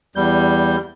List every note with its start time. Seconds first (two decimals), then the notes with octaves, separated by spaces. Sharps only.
0.16 E2 G3 G6